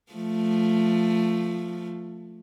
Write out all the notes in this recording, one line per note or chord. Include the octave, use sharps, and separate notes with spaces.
F3 A3